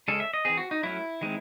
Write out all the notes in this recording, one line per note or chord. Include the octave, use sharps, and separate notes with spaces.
C#3 G#3 C#4 A4
E5
D#5
E3 C4 G#4
F#4
D#4
F#3 A3 C#4 E4
D#3 G#3 C4